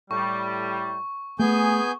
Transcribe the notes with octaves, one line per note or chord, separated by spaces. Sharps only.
A2 G3 C#6
A3 B3 G#4 G#5 G6